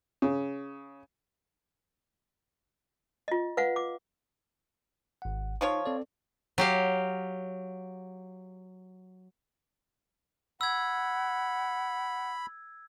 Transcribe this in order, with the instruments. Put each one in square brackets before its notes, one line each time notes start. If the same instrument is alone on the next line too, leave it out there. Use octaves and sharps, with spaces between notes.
[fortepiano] C#3
[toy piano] F4 D#5
B4 F5 F#5
D6
[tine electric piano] G#1 F#5
[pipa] F3 F4 C#5 [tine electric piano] D#4
[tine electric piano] C4 A4 D5
[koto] F#3 G4 F5
[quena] F#5 [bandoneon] B5 [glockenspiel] E6 G#6